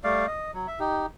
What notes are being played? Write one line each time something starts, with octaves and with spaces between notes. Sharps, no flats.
G3 A3 D5 F5
D#5
F#3
E5
D#4 G4